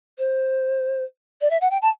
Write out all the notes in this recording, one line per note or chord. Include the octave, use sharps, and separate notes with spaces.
C5
D5
E5
F#5
G5
A5